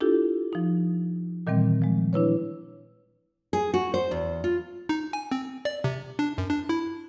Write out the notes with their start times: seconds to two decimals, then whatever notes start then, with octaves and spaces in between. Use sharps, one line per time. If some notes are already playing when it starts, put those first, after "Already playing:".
0.01 D4 E4 F4 G4 A4
0.53 F3 D#4
1.47 A#2 D#3 E3 G3 C4
1.82 F3 G#3
2.13 D4 E4 B4 C#5
3.53 G#4
3.74 F#4
3.94 C5
4.11 E2
4.44 F4
4.89 D#4
5.13 G#5
5.31 C4
5.65 D5
5.84 C3
6.19 D4
6.38 F#2
6.50 D4
6.69 E4